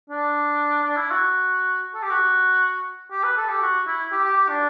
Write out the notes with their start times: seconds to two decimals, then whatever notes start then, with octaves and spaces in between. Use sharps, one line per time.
0.09 D4
0.83 D4
0.96 E4
1.11 F#4
1.94 A4
2.02 G4
2.10 F#4
3.11 G4
3.23 B4
3.37 A4
3.49 G4
3.62 F#4
3.87 E4
4.12 G4
4.24 G4
4.37 G4
4.49 D4